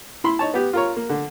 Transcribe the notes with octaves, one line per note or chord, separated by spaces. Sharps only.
E4 B5 C6
D#4 C#5 A5
B3 G4
F4 A#4 C#5
A#3
D3